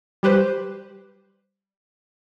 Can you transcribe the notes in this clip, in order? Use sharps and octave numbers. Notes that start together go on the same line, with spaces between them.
G3 G4 B4 C5